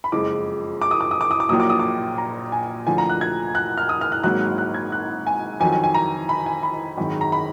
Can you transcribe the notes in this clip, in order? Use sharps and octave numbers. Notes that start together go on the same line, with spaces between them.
B5
F#1 F2 F3 G#3 D6
D6
D#6
D6
D#6
D6
D#6
D6
A#1 A#2 F#3 A#3 D#6
D6
D#6
D6
A#5
G#5
D2 D3 F3 G#5
A#5
F#6
G#6
F#6
F6
D#6
F6
F#6
G#1 G#2 F#3 A#3 F#6
F#6
F#6
G#6
F#6
G#5
F2 D#3 F#3 G#5
G#5
G#5
A#5
B5
G#5
B5
G#1 F#2 D#3 G#3
A#5
B5